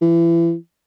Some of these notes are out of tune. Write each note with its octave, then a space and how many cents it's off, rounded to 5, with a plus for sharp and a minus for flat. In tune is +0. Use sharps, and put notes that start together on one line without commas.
E3 +30